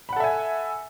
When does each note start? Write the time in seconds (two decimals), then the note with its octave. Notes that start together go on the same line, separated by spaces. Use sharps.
0.09 B5
0.13 F#5
0.16 A4
0.20 E5
0.24 G#5